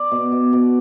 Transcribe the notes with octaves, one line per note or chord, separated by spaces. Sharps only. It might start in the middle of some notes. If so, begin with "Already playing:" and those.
Already playing: D5
B2
B2
B2